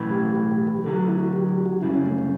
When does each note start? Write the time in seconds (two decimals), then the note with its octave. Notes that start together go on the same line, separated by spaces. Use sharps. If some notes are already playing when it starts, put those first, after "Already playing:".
Already playing: B1 A2 E3
0.11 G4
0.35 G4
0.52 G4
0.67 G4
0.84 D2 D3 F#3 A4
0.97 F#4
1.08 E4
1.20 F#4
1.33 G4
1.49 G4
1.66 F#4
1.82 F#2 C#3 G3 E4
1.94 C#4
2.06 A3
2.18 C#4